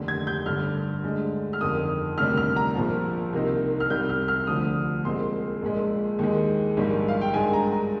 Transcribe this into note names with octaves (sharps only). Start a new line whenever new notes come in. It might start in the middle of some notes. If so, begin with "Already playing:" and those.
Already playing: F1 D#2 D3
G#6
G6
G1 G2 D3 G3 F6
D2 D3 G#3
F6
G1 F2 D#3 D#6
D2 C3 D#3 G3 D4 F6
F6
A#5
A#1 A#2 F3
C2 C3 D#3 A#3 D#4
F6
C2 C3 G3 G6
F6
F6
D2 D3 F3 D#6
C2 A#2 G#3 C4 C6
A#1 A#2 G#3
D#2 D#3 G#3
A#1 G#2 D#3 G3
F5
G5
G2 D#3 G#3 G#5
A#5
A#5